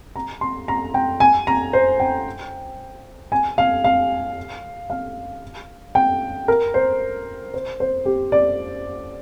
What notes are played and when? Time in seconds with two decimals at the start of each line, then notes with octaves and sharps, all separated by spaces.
0.16 A#5
0.41 C6
0.68 A#5
0.94 G5
1.20 G#5
1.47 A#5
1.73 C5
2.00 G5
3.32 G#5
3.58 F5
3.84 F5
4.90 F5
5.95 G5
6.48 A#4
6.74 C5
7.54 C5
7.80 C5
8.05 G4
8.32 D5